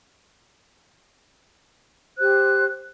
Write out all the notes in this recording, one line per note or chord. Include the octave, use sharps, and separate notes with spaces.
G4 C5 F#6